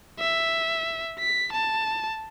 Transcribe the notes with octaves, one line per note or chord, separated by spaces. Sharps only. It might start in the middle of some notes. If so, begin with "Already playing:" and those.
E5
B6
A5